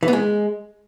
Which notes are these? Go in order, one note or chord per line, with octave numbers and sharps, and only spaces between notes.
E3
B3
G#3